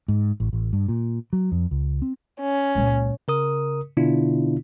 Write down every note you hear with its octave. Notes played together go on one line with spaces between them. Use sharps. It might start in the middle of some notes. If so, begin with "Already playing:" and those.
G#2
A1
A1
G2
A#2
F#3
F2
C#2
C4
C#4
C#2 A#2
C#3 A#4 D#6
B2 D3 B3 D4 E4 F4